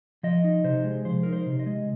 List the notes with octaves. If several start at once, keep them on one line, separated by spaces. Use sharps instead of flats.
F3 D#5
D#4
C3 C5
G#3
F3 C5
D#4 A#4
C5
C3
D#5
G#3